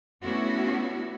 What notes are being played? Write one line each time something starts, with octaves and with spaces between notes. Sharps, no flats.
A3 B3 C#4 D4 E4 F#4